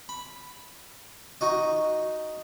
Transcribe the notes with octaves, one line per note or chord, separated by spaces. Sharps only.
B5
D#4 F#4 D#5